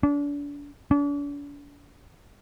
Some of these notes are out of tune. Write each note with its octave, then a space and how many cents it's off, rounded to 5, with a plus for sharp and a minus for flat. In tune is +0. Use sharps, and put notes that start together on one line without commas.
D4 -35
D4 -45